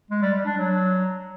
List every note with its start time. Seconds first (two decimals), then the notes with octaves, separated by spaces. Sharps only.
0.11 G#3
0.22 G3
0.34 G3
0.45 D4
0.57 F#3